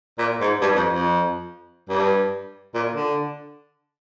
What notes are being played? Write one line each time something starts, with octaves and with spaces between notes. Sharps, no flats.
A#2
G#2
G2
F2
F2
G2
A#2
D3